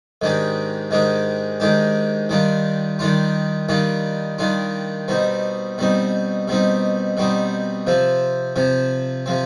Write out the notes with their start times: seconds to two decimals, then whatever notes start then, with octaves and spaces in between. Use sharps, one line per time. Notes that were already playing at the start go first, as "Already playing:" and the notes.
0.22 G#2 D#3 G#3 D4 G4
0.91 G#2 D#3 G#3 D4 G4
1.60 G#2 D#3 G#3 D4 G4
2.29 D#3 G3 D4 F4
2.99 D#3 G3 D4 F4
3.69 D#3 G3 D4 F4
4.38 D#3 G3 D4 F4
5.08 B2 G3 C4 D#4
5.78 B2 G3 C4 D#4
6.48 B2 G3 C4 D#4
7.17 B2 G3 C4 D#4
7.87 C3 F3 C4
8.56 C3 F3 C4
9.26 C3 F3 C4